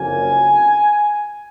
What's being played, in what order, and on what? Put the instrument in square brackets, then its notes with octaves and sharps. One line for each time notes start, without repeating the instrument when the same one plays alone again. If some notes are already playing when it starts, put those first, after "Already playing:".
Already playing: [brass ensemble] F#1 F2 C#3 F#3 A#3 G#5